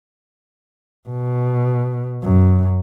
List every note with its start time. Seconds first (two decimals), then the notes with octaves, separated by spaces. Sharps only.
1.09 B2
2.23 F#2